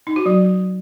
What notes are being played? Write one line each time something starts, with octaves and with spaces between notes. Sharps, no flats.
D#4
F#4
F#3